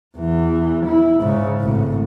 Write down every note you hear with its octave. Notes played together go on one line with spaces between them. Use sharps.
E2 E3
E4
G#2 C#3
G#1 A2